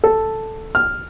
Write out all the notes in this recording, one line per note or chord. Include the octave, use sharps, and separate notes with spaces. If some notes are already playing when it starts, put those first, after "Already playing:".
A4
F6